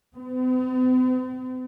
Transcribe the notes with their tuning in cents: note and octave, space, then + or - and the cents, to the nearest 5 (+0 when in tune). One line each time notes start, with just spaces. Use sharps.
C4 -45